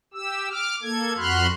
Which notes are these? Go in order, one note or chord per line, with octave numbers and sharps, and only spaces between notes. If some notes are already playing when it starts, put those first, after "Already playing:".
G4 E6
D6 F6
A#3 A4 G#6
F2 F#4 B5 C6 F6 F#6